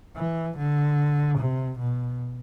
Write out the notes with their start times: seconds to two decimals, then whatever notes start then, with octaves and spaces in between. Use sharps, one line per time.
0.16 E3
0.58 D3
1.38 C3
1.79 B2